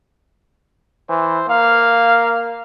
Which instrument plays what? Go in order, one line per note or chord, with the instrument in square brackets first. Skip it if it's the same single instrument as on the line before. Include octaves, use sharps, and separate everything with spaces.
[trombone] E3 [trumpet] C5
[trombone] A#3 [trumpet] F5